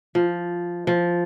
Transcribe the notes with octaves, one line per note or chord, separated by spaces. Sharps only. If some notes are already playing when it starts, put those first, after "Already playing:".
F3
F3